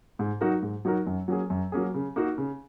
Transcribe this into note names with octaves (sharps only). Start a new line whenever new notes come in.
G#2
F#3 D#4 F#4 A#4
G#2
F#3 D#4 F#4 A#4
F#2
F#3 A#3 C#4 G#4
F#2
F#3 A#3 C#4 G#4
C#3
A#3 D#4 F#4
C#3